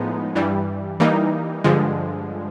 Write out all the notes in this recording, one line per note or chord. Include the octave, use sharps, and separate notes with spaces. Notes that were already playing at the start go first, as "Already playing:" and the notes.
Already playing: A2 F3 G#3 B3 D#4
G2 E3 G3
E3 G3 A#3 D#4
G2 D3 F3 G#3